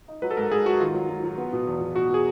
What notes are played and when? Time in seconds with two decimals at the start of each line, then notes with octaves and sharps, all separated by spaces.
0.08 D#4
0.22 F#3 B4
0.31 A4
0.37 G#2 A#4
0.51 G#2 G#4
0.66 F#3 F#4
0.80 D#3 F4
0.94 F#3
1.09 F#3
1.24 F#3
1.38 B3
1.53 B2
1.67 E2
1.81 B2
1.96 B2 F#4
2.09 B2 G#4